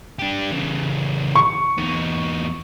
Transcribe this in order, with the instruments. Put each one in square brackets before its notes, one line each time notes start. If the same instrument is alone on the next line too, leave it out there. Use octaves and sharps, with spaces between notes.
[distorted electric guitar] D4 G4
C#3 E3
[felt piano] C#6
[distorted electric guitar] E2 D#4